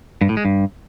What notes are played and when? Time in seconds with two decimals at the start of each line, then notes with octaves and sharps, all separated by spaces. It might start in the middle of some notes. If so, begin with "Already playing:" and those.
0.21 G2
0.29 A2
0.37 G#3
0.45 G2